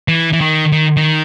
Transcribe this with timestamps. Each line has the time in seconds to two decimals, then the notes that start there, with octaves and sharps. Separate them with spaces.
0.08 E3
0.33 E3
0.41 D#3
0.72 D#3
0.97 D#3